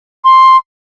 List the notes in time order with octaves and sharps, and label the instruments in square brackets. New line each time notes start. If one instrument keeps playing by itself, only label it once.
[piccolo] C6